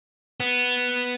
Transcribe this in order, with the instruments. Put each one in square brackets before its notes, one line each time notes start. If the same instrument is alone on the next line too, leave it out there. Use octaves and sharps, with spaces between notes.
[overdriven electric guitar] B3